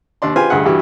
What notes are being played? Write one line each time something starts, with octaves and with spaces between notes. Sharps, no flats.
D#2 D4 D5 C6
F4 G4 B4 C5 G#5 C6
D2 G2 G#4 F#5
G2 E3 F#4 G4